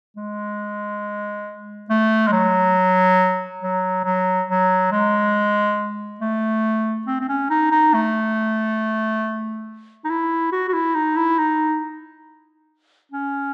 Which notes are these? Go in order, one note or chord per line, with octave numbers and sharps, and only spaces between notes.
G#3
A3
G#3
F#3
F#3
F#3
F#3
G#3
A3
C4
C4
C#4
D#4
D#4
A3
D#4
E4
F#4
F#4
E4
D#4
E4
D#4
C#4